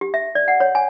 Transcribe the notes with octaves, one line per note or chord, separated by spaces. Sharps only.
G4
E5
D5
F#5
C#5
G#5